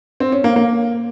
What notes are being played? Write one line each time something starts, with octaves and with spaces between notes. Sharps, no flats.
C4
C#4
A#3
A#3